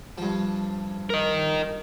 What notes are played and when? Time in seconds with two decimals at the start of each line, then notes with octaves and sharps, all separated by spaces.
0.18 G2 F3
1.10 A#4 D#5